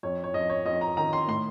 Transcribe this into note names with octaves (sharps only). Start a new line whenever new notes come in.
F2 C#5
C#5
F2 D#5
C#5
F2 D#5
A#5
D#3 A#5
C6
A2 C6